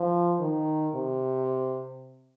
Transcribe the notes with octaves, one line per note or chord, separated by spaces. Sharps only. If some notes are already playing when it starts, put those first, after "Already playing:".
Already playing: F3
D#3
C3